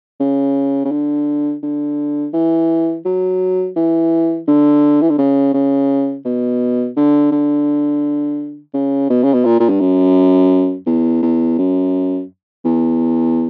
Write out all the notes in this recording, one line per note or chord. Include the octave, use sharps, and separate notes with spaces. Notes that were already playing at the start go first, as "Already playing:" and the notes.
C#3
C#3
D3
D3
E3
F#3
E3
D3
E3
D3
C#3
C#3
B2
D3
D3
C#3
B2
C#3
B2
A#2
A#2
G2
F#2
E2
E2
F#2
E2